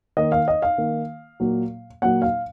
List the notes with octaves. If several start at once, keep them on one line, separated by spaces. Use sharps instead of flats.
D#3 A#3 D#5
F5
D#5
F5
D#3 A#3
A#2 F#3 A#3
A#2 F#3 A#3 F#5
F5